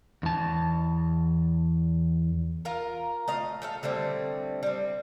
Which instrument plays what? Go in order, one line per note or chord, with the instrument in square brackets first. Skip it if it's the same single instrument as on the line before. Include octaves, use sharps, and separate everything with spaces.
[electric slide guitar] E2 A5
[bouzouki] F4 A#4 A#5
A3 D#5 F5
A3 A4 F5
D3 G3 A3 C4
G3 C4